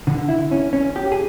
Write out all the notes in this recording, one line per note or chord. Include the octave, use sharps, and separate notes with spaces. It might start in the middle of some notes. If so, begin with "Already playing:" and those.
D3
E4
C#4
C#4
G4
G#4